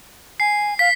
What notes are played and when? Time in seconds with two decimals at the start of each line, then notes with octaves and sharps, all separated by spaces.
0.40 G#5 C7
0.79 F5 B6